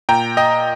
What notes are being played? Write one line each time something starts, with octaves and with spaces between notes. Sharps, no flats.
A#2 G5 A#5
D#5 G5